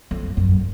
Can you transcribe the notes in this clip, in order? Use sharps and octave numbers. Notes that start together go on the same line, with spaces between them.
F2
F#2